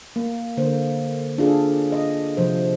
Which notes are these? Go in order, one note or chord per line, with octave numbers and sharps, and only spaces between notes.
A#3
D3 A#3 C5
D4 F4 G#4 A4
D#5
C3 F3 C5